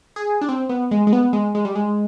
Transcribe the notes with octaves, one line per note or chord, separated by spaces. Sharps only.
G#4
D4
C4
B3
G#3
G#3
B3
G#3
G#3
G3
G#3